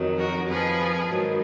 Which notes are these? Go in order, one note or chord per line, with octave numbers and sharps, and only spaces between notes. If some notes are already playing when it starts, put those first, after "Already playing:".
Already playing: F2 D#3 F#3
F#4 A#4
F2 F3 G#4 B4
G#2 D#3 F#3